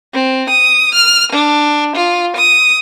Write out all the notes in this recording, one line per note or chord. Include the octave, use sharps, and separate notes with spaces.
C4
D#6
F6
D4
F4
D#6